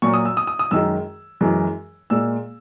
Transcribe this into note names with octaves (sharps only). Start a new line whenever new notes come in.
A#2 F#3 C#6
D#6
E6
D#6
D#6
D#6
F#2 D#3 G#3 E6
F#2 E3 G#3
A#2 G#3 E6